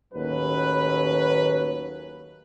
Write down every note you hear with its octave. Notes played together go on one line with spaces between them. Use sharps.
D#2 A2 F#3 C#4 B4